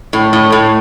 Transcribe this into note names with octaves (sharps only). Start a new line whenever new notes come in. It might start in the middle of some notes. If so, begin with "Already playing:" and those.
A2
A2
A2